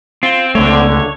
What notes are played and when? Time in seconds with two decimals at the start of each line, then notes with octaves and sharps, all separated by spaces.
0.23 C4 F4
0.55 C#2 D3 A3 C#5